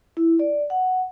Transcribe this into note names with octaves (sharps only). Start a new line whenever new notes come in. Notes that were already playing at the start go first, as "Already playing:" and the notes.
E4
D5
F#5